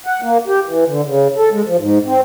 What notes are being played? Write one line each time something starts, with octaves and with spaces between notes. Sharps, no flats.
F#5
A#3
G4
E3
D3
C#3
A4
G#3
F3
G#2
C4